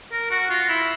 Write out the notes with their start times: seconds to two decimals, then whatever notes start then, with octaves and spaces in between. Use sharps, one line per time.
0.12 A#4
0.31 F#4
0.50 F4
0.69 E4